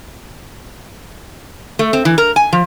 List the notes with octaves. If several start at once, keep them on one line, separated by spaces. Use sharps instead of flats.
A3
C4
E3
A#4
G#5
F3